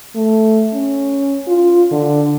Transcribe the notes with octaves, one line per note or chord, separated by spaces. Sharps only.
A3
C#4
F4
D3